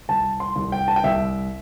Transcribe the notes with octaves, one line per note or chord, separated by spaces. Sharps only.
C2 A5
C6
C2
G5
A5
G5
C2 E5